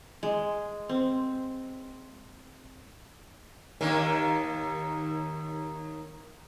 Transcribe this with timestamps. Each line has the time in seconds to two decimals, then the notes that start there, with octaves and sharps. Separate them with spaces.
0.23 G#3
0.89 C4
3.81 D#2 D#3 A#3